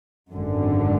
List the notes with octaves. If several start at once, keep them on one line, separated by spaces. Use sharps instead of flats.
G#1 F#2 D3